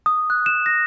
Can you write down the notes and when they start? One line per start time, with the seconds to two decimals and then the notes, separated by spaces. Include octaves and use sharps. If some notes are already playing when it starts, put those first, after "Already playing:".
0.06 D#6
0.30 F#6
0.46 E7
0.66 A#6